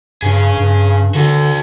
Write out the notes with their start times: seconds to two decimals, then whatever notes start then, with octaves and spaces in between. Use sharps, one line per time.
0.22 G2 C#3 G#4
0.58 G2
1.15 D3 F#4 A4